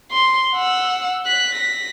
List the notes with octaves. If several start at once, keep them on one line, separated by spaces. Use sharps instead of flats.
C6
F#5 E6
F#6 B6
A#6 B6